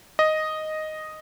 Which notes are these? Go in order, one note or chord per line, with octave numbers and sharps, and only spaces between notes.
D#5